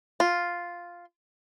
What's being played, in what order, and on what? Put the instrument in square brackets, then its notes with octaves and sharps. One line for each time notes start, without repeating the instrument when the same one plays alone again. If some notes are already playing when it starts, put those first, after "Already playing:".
[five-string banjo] F4